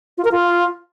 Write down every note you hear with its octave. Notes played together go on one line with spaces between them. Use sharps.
F4
A#4
F4